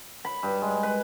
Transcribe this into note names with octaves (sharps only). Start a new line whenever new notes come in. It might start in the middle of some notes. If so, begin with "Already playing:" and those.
B5
G2
G#3
B4